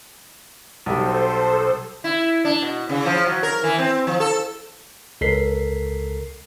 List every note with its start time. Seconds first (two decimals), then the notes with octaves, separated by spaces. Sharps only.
0.86 B1 G3 A4 C5
2.04 E4
2.45 D4
2.62 B2
2.89 C#3
3.06 F3
3.26 F#3
3.43 A#4
3.63 E3
3.78 C4
4.07 F3
4.20 A4
5.21 C#2 A4 A#4 B6 C7